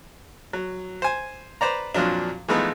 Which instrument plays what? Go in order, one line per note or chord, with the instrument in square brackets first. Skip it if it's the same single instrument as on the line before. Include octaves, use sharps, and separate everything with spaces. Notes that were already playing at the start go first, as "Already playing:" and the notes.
[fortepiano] F#3
C5 G#5
B4 C5 D5 A#5
F2 A#2 F3 F#3 D4
E3 F3 G#3 A3 B3 D#4